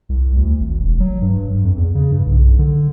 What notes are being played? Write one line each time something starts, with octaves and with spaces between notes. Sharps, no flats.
C2
D2
G#1
E1
F#3
G2
F2
E2
C#3
G2
B1
D3